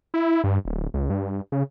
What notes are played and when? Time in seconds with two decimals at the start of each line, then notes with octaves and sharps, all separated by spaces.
0.14 E4
0.44 G2
0.65 D1
0.94 C#2
1.10 G2
1.52 C#3